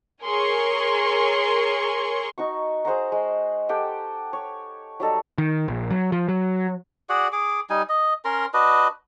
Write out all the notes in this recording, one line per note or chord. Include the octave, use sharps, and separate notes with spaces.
G#4 A#4 C#5 G#5 C6 C#6
D#4 F#4 C#6
G#4 C5 F#5 A#5
G#3
G4 A4 F#5 G5
C#5
F#3 G3 D#4 A4
D#3
A#1
F#3
F3
F#3
F#4 G#4 D5 F#5
G#4 D6
G3 D#4 G#5
D#5
C#4 A#4 A#5 C6
D4 F#4 B4 D#5